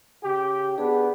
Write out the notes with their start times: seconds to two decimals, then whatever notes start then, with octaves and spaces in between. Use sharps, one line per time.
0.24 C#3 G4
0.78 B3 D4 G#4